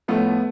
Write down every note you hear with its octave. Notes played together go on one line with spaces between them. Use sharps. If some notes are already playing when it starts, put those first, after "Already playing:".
A2 F3 A3 B3